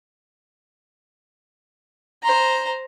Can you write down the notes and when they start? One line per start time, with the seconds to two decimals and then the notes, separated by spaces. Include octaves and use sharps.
2.23 C5 A#5